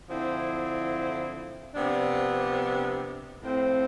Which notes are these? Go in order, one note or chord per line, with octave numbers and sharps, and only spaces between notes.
D3 F3 C4 E4
C3 F3 B3 D4
A2 F3 C4